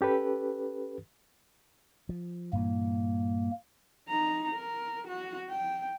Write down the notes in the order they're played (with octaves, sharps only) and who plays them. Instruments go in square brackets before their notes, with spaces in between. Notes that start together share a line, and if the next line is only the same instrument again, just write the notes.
[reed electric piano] C#4 G4 A4 B4
[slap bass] F3
[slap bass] G2 A#2 E3 [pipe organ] A#3
[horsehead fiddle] D#4 A#5
A#4
F#4
G5